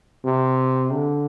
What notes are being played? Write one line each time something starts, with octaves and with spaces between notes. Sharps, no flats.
C3
D3